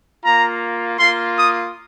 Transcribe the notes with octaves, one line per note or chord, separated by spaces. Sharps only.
A#3 F4 A#5
A#3 F4 C6
D#6